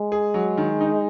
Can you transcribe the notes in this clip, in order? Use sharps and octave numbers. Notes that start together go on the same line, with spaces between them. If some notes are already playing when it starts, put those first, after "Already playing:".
Already playing: G#3
G#4
F#3
D#3
D#4